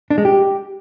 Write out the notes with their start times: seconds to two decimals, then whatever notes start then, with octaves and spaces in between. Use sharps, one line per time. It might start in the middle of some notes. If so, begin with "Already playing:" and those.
0.10 D4
0.18 G#3
0.25 G4